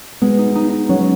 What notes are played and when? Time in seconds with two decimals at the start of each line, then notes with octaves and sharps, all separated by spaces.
0.22 G#3 B3
0.38 D#4
0.55 D#4
0.73 D#4
0.89 F#3 C#4